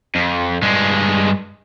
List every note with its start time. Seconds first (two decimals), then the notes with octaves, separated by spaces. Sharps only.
0.15 F2
0.62 G2 G#3